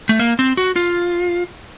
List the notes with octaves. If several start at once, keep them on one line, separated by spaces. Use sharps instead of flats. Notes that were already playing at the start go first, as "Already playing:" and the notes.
A3
A#3
C4
F#4
F4